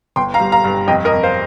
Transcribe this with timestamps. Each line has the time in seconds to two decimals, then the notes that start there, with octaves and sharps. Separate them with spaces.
0.16 G1 G5 C6
0.34 F5 A#5
0.40 G3
0.52 F5 A#5
0.64 G2
0.88 F2 D#5 G5
1.05 A#4 D#5
1.12 F2
1.23 C5 F5